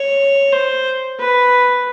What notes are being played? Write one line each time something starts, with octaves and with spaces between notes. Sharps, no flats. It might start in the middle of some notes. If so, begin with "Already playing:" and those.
Already playing: C#5
C5
B4